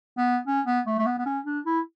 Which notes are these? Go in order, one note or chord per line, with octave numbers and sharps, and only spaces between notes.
B3
C#4
B3
A3
A3
B3
B3
C#4
D4
E4